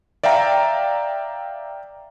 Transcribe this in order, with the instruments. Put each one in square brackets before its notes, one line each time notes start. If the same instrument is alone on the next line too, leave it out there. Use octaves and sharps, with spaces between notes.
[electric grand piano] D5 E5 F5 G5 A#5